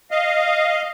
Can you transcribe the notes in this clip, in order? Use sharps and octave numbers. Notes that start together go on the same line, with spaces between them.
D#5 F5